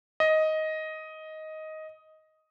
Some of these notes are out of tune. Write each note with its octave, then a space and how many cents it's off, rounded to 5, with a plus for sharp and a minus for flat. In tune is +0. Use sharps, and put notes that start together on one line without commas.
D#5 +10